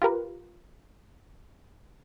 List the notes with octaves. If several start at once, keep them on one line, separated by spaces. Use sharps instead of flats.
F4 G4 A#4 B4